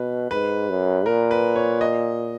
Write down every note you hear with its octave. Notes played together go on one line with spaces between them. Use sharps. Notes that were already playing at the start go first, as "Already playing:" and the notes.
Already playing: B2 B4
G#2 B4
F#2
A#2 A#4
B4
C#5
D#5